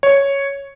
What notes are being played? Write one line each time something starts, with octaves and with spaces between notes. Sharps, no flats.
C#5